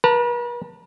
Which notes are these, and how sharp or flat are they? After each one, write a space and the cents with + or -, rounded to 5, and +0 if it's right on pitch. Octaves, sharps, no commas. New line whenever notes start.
B4 -45 A5 +35